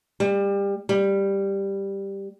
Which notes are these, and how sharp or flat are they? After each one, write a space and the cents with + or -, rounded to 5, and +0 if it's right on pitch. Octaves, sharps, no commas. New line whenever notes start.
G3 +25
G3 +5